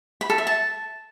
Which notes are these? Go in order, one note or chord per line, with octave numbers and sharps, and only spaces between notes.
B5
A4
E5
A5